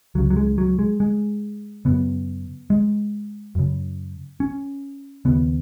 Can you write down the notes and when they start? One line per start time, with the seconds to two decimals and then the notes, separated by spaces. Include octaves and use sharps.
0.15 C#2 C#3 F#3
0.30 F#3
0.36 G#3
0.58 F#3
0.79 G#3
1.00 G#3
1.85 F#2 C#3 B3
2.70 G#3
3.55 F#2 C#3
4.40 C#4
5.25 D#2 C#3 B3